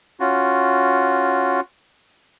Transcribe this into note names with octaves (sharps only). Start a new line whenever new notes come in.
C#4 F4 F#4